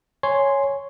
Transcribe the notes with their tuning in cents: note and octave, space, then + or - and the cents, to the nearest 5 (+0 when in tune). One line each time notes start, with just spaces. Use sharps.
C#5 +0 G#5 +0 C6 +0